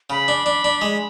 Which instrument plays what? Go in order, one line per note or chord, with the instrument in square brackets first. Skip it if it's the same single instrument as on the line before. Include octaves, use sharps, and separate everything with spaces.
[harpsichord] C#3 [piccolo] B5
[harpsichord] D4
D4
D4
G#3